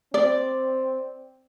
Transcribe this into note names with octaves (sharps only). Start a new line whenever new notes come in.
C4 D5